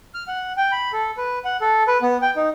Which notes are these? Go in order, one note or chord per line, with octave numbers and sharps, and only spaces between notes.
F6
F#5
G5
B5
A4
B4
F#5
A4
B4
B3
G5
D#4